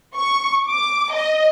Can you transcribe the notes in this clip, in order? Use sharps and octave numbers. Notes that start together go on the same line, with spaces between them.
C#6
D6
D#5